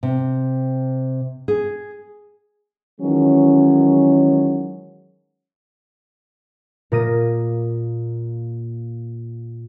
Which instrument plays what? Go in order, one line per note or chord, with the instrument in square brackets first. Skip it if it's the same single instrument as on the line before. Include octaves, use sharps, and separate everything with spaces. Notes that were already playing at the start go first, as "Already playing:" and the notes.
[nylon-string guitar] C3
G#4
[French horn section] D#3 E3 F#3 G#3 C#4
[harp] A#2 A#3 D#6 A#6 D#7